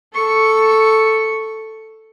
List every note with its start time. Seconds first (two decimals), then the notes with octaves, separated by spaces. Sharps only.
0.14 A4 C#6